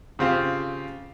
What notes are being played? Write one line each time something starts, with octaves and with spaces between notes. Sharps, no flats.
C#3 C4 F4 G4